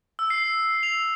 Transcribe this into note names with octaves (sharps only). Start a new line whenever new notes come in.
E6
C7
F7